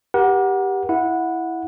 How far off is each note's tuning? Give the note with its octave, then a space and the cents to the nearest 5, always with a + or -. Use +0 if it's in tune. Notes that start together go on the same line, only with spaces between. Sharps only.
G4 +0 A#4 +45 F#5 +0
E4 -5 F#5 -15